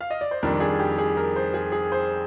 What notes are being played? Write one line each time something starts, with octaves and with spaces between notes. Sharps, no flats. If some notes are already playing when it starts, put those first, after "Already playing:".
F5
D#5
D5
C5
F2 D#3 G3 D4 A#4
G#4
G4
G#4
A#4
C5
G#4
G#4
C5